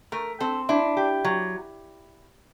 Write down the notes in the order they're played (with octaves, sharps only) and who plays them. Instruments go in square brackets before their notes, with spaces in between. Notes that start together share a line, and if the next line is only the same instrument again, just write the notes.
[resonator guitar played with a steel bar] A3 [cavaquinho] A#4
[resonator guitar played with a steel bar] C4 [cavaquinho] A4
[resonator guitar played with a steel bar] D4 [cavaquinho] E4
[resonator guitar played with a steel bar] G4
F#3